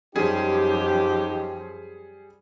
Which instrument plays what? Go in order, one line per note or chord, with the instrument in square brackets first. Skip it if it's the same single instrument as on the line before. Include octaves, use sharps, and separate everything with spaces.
[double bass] F#2 F3 [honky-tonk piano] G3 G#4 [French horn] D#4 [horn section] G4